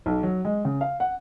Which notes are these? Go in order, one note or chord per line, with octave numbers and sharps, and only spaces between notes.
B1
F#3
G#3
C#3
F5
F#5